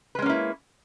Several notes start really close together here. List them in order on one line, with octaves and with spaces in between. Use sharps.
B4 G#3 C#4 A#3 E4